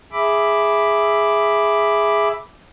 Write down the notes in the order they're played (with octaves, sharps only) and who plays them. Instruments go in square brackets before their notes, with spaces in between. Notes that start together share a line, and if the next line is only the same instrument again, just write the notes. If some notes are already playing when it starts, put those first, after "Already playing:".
[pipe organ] G#4 E5 B5 D6